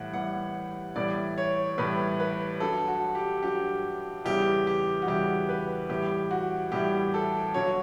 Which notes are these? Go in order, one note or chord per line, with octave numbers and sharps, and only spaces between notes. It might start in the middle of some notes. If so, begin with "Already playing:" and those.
Already playing: A2 E3 G3 F#5
A2 E3 G3 F#5
A2 E3 G3 D5
C#5
A2 E3 G3 B4
B4
G2 F#3 A4
F#4
G4
G2 F#3 G4
E2 C#3 E3 G3 G4
G4
F#4
E2 C#3 E3 G3 G4
B4
A2 E3 G3 G4
F#4
A2 E3 G3 G4
A4
G2 D3 F#3 C#5